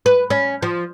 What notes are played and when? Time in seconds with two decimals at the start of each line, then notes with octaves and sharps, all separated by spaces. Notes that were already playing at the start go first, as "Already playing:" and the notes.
0.06 B4
0.30 C#4
0.62 F3